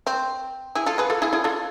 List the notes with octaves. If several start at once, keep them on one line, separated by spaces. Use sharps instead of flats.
C4
E4 G#4
F4 A4
G#4 B4
F4 A4
E4 G#4
E4 G#4
F4 A4